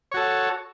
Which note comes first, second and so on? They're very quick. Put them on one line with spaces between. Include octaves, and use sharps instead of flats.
C#5 F#4 A4